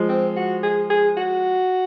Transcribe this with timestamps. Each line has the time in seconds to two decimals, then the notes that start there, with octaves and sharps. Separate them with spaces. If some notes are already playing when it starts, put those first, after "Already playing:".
Already playing: F3 G#3
0.09 C4
0.36 F#4
0.63 G#4
0.90 G#4
1.17 F#4